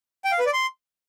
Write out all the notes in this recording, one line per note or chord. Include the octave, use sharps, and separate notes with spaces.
G5
F5
B4
D5
C6